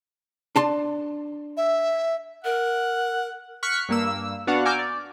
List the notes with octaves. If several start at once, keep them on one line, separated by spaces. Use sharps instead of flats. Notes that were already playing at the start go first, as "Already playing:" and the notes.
D4 A5 C6
E5
A#4 F#5
C#6 F6 F#6 B6 C#7
G2 A#3 E6
B3 D4 F#4 F5 F#5
G#5 A#5 D6 E6 F6 G6
D5